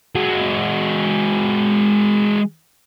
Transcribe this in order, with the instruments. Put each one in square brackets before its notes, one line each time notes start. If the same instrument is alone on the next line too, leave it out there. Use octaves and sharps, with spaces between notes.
[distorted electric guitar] G#3 F#4